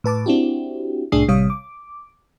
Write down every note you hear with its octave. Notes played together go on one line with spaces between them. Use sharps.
A2 B4 A5 D6
C4 D4 E4 F#4 G4
C2 A2 D4 G#4 D#6 C7
A1 C3 G3 C#5 F5 D#6
D6